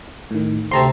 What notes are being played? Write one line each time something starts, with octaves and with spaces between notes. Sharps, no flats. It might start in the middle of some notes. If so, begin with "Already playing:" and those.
A2 D#3
D2 C3 C4 A5 A#5 C6